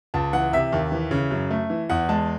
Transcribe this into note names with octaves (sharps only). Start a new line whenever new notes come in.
C#2 A5
E3 F#5
C3 E5
D#2
E3
C#3
F#2
A3
E3
E2 F#5
G#3 A5